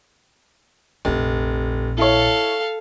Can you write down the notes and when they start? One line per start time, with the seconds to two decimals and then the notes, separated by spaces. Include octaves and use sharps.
1.05 F1 A#1 A#2
1.98 E4 A4 C#5 F5